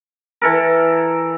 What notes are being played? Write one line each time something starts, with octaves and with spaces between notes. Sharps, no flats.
E3 A4 A#4